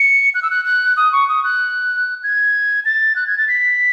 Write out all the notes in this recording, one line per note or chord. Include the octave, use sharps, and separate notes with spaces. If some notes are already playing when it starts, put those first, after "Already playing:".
Already playing: C#7
F#6
E6
F#6
F#6
D#6
C#6
D#6
F#6
G#6
A6
F#6
G#6
A6
B6